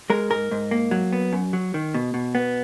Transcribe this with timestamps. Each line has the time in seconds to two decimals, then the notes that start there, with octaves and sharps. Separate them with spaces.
0.10 G#3 A#4
0.30 G#2 A#4
0.51 G#2
0.71 A#3
0.91 F#3
1.13 B3
1.33 F#2
1.53 F#3
1.74 D#3
1.94 B2
2.14 B2
2.35 B3